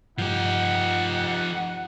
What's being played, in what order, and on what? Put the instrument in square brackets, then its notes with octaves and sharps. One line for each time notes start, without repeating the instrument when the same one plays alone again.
[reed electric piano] G2 [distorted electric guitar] F3 G4 [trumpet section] D#4 F#5